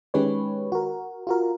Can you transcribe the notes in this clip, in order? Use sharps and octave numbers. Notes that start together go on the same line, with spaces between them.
D#3 G#3 C#4 G4 B4 C#5
F#4 A#4
F4 F#4 A#4